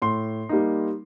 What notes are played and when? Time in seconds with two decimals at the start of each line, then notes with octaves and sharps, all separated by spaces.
0.02 A2 C6
0.49 G3 A#3 D#4